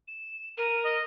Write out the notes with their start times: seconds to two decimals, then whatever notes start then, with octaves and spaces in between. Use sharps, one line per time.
0.08 E7
0.58 A#4 D#7
0.84 D#5